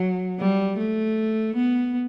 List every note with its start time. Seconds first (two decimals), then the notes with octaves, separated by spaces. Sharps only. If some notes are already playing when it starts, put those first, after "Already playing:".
Already playing: F#3
0.39 G3
0.78 A3
1.56 B3